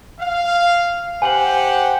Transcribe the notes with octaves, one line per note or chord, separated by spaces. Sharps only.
F5
G4 C5 F#5 G#5 F#7